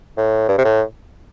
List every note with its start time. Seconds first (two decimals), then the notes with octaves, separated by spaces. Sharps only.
0.17 A2
0.49 G2
0.58 C3
0.65 A2